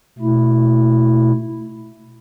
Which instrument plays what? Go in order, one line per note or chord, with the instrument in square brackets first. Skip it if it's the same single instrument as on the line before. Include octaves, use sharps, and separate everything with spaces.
[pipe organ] B2 A3 E4